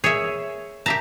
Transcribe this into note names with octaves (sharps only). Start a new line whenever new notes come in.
G#4 C#5 E5
G4 E5 A5 A#5